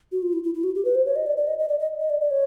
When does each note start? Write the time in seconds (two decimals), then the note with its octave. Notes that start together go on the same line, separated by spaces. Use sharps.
0.12 F#4
0.22 F4
0.33 E4
0.43 E4
0.54 E4
0.64 F#4
0.75 G4
0.85 B4
0.95 C5
1.06 C#5
1.16 D#5
1.26 D5
1.37 D5
1.47 D#5
1.59 D#5
1.69 D5
1.79 D#5
2.00 D#5
2.10 D5
2.21 D5
2.31 C#5